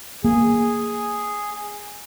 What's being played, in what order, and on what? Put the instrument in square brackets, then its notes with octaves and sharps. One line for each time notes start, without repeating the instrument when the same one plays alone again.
[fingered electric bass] A#3 [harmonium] G#4